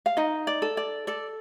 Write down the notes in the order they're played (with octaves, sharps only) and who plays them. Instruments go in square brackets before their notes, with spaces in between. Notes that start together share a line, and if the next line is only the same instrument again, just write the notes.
[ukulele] F5
D#4 D#5
D5
A4
D5
A4 D5